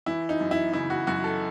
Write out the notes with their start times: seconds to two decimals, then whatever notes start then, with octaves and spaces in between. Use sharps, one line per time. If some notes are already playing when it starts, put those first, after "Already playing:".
0.06 E3 E4
0.29 D#4
0.41 F#2
0.51 E4
0.73 C#3 E4
0.90 F#4
1.07 F#2 F#4
1.24 A4